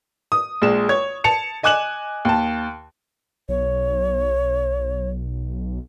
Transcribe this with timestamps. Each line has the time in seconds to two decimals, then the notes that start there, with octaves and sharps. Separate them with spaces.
0.32 D#6
0.62 A#1 G#3 E7
0.89 C#5 G#6
1.24 A5 C#7 F7
1.63 D#5 G#5 D6 F#6 E7 F#7
2.25 D#2 A5
3.49 B1 C#5